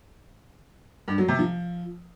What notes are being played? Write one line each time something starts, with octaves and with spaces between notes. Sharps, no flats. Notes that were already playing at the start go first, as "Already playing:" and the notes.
G2
F#3
C3
F3